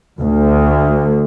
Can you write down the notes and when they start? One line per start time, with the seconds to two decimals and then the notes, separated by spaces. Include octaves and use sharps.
0.20 D2